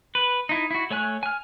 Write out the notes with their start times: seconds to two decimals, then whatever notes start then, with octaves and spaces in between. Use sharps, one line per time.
0.15 B4
0.49 D#4 E4
0.71 E4 F#4
0.90 A3 C#5 G#5 F#6
1.23 G#5 F6